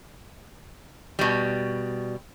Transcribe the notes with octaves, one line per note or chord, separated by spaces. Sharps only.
B2 G3